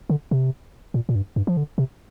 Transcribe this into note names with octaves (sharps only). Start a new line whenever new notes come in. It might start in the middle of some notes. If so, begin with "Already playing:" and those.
D3
C3
A#2
A#2
G2
G2
F3
D3
C3